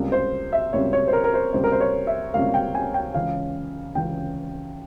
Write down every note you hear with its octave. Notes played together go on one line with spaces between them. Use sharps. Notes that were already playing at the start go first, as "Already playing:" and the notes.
Already playing: C#2 C3 G3 A#3
C5
E5
C#2 C3 G3 A#3 C#5
C#5
C5
A#4
A#4
C5
C#2 C3 G3 A#3 C5
A#4
C5
C#5
E5
C#2 C3 G3 A#3 F5
G5
G#5
G5
C#2 C#3 E3 F5
C#2 C#3 E3 G5